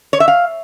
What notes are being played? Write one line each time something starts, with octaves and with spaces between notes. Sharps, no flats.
C#5
E5
F5